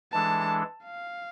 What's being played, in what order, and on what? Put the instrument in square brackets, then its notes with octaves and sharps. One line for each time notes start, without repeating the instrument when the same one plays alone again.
[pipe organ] E3 G#3 D4 A4 [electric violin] A5
[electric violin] F5